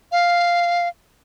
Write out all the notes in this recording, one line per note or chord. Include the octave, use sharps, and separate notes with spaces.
F5